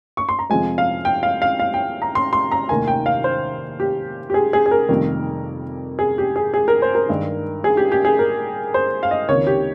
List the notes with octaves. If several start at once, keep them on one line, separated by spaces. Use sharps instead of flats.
C#6
C6
A#5
F2 C3 F3 G#3 G#5
F5
G5
F5
F5
F5
G5
A#5
C6
C6
A#5
F1 D#2 D#3 A#3 G#5
G5
F5
C5
G4
G4
G#4
G#4
G#4
A#4
F1 F2 D#3 G3 A#3
G#4
G4
G#4
G#4
A#4
C5
A#4
G2 D#3 G#3
G#4
G4
G4
G#4
A#4
C5
F5
D#5
C#2 C3 D#3 A#3 C#5
G4